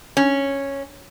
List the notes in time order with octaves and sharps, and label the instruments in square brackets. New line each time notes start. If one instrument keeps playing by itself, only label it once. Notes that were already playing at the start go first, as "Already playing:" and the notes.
[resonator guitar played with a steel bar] C#4